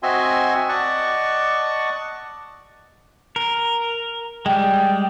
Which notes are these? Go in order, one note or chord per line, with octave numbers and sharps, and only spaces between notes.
C4 F#4 D#5 E5 G#5 C6
D5 D#5 F#5 A5 C#6
A#4
G3 G#3 G5